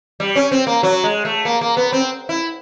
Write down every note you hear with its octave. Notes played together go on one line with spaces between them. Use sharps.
G3
C#4
C4
A#3
F#3
G#3
A3
A#3
A#3
B3
C4
E4